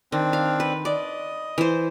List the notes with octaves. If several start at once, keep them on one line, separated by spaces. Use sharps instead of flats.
D#3 C4 D4
F5
B4
D5 D#5
E3 C5